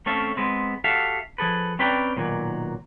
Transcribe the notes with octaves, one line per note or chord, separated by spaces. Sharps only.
A3 C4 C#4 A4 E5 F5
G#3 B3 C4
F#4 G4 A4 E5 F5
F3 G#4 A4 B4
C4 C#4 B4 D5 G5 A#5
B1 A#2 D#3 F#3